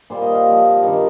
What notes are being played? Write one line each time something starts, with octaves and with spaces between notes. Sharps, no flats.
A#2 G3 C5
D#5
F5
C3 F3
G2 D#3 G3